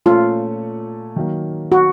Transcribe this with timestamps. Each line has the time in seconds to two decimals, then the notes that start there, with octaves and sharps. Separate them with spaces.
0.06 A#2 A3 C#4 F4 A4
1.16 D#3 F#3 A#3
1.72 F#4